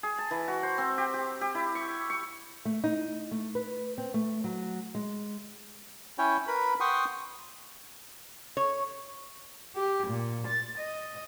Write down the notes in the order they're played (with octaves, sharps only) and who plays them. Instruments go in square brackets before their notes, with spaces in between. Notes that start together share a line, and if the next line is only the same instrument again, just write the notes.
[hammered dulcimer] G#4
A5
E3
F#4
C5
C4
G4
G4
G4
E4
C#6
C#6
[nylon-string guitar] A3
D#4
A3
B4
C4
A3
F#3
G#3
[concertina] C#4 E4 C#5 G5
A#4 B4 B5
F#5 G5 C6 C#6 D#6
[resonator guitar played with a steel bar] C#5
[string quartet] G4
A#2
A6
D#5